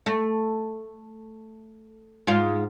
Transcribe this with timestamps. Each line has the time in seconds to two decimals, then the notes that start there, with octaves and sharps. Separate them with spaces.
0.06 A3
2.27 G#2 F4